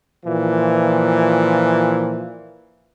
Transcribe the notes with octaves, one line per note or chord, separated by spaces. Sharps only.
A#2 E3 F3